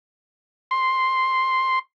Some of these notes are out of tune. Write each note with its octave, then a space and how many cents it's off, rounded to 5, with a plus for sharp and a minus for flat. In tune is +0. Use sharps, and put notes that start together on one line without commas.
C6 +0